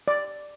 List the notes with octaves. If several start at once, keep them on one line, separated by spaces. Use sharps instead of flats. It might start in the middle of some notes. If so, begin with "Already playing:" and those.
D5